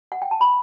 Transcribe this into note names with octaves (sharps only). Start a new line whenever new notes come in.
F#5
G5
A5
B5